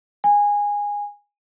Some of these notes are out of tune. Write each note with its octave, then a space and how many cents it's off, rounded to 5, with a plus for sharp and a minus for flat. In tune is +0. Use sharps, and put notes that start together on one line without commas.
G#5 -15